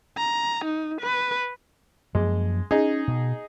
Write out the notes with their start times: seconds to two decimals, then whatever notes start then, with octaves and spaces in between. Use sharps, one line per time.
0.17 A#5
0.65 D#4
1.01 B4
2.15 F#2 F3 G#3 A#3
2.71 C#4 D#4 G#4
3.08 B2